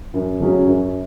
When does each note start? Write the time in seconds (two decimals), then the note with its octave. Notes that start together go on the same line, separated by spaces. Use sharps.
0.14 F#2
0.40 C#3 F#3 C#4 G#4
0.67 F#2